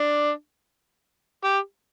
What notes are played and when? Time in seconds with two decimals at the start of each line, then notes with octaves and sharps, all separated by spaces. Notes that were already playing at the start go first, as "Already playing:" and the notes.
Already playing: D4
1.45 G4